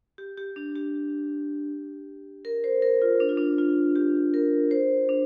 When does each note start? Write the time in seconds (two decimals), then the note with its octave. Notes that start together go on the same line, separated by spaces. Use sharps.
0.18 G4
0.38 G4
0.56 D4
0.76 G4
2.45 A#4
2.64 C5
2.82 A#4
3.02 F4
3.20 D4
3.29 F4
3.37 D4
3.58 F4
3.96 G4
4.34 A#4
4.71 C5
5.09 D4